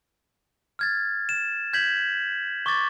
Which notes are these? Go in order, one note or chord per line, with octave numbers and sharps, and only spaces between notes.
F6 G#6 A6
E7
G6 G#6 B6 F#7
C#6 D6 A6